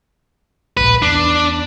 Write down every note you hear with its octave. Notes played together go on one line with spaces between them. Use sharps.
D1 A#1 G#2 B4
E2 D4